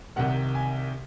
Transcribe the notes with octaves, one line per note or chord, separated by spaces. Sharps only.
C2 C3 D#3 F#5
G#5